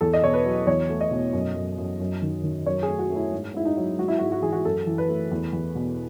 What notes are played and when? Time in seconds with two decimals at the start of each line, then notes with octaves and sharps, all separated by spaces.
0.01 E2 A4
0.14 D#5
0.23 B2 C#5
0.34 B4
0.46 F#3
0.67 E2 C#5
0.90 A3
1.01 D#5
1.11 B2
1.33 F#2
1.55 F#2
1.78 F#2
2.00 F#2
2.22 D#3
2.43 D#3
2.66 F#2 C#5
2.83 G#4
2.88 A3
2.99 F#4
3.10 A3
3.16 E4
3.32 G#2
3.54 G#2 E4
3.65 D#4
3.77 F#3
3.98 G#3 F#4
4.08 E4
4.19 G#2 F#4
4.32 F#4
4.42 E3 G#4
4.52 F#4
4.65 F#2 A4
4.87 E3
4.98 B4
5.09 A3
5.31 E2
5.53 E2
5.75 B2